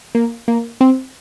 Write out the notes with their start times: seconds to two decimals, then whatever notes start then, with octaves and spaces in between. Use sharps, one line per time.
0.15 A#3
0.48 A#3
0.81 C4